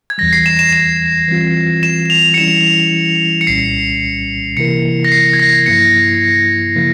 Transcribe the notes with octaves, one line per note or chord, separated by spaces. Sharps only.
G#6
E2 E3 G3 A#6
C7
E7
E7
E7
E3 G3 C4 F4
E7
E7
F7
C#7
E3 G3 C#4 E4 E7
C#7
C2 A#2 G3 C#4 C7
C3 E3 A#3 E4 A#4 C#7
A#6
C7
G#6
A#6
G2 F3 A#3 E4 C#7
C#3 F3 A#3 E4